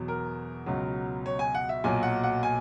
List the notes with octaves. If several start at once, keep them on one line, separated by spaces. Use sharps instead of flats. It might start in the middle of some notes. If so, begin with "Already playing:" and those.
Already playing: E2 B2 F#3
A#4
C#2 B2 F#3
C#5
G#5
F#5
E5
B1 A#2 F#3 G#5
F#5
F#5
G#5